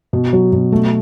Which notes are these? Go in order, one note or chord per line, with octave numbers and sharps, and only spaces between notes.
B2
F#3
B2
A3